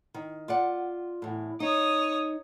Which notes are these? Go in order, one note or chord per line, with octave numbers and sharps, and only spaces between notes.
D#3
F4 D5 F#5
E2 A2
D#4 C#5 D#6